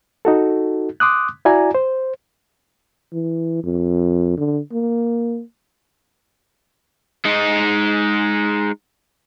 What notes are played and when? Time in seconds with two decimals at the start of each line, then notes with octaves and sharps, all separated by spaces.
0.25 D#4 F#4 A4
1.00 C6 D6 D#6 F#6
1.45 E4 F#4 D5 G#5 A#5
1.75 C5
3.13 E3
3.64 F2
4.37 D3
4.72 A#3
7.25 G#3 D#4